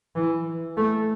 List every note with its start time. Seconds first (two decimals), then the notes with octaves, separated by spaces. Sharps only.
0.16 E3
0.77 A3